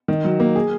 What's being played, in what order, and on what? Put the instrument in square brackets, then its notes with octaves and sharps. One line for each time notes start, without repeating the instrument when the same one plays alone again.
[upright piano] D#3
F#3
A#3
G#4